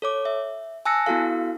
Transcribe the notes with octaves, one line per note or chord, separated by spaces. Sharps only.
A4 C#5 D6
E5
G#5 A5 E6 F#6 A#6 C#7
B3 E4 F#4 A4 F5